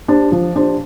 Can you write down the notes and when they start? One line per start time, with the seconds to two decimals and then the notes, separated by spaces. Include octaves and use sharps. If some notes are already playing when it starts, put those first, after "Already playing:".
0.08 D4 G4 C5
0.32 F3
0.56 D4 G4 C5